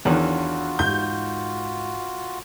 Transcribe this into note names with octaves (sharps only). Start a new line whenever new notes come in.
E2 D#3 E3 D4 F4 F#4 C#5 F#5
G#2 G6